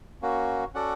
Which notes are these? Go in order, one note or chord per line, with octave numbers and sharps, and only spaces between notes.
A#3 C#4 F#4
C#4 F#4 A4 D5 F#5